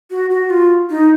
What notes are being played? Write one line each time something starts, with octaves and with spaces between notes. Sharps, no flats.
F#4
F#4
F4
D#4